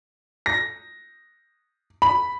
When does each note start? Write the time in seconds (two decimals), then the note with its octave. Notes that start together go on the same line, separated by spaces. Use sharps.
0.46 A#6
2.02 B5